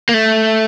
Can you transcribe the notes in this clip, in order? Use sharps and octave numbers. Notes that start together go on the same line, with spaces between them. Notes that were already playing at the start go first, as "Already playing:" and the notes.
A#3
A3